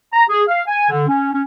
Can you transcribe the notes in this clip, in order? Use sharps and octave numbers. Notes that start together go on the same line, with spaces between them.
A#5
G#4
F5
G#5
D3
C#4
C#4